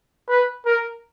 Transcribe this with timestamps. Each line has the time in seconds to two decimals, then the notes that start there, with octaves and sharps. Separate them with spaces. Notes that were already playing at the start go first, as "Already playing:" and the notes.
0.28 B4
0.66 A#4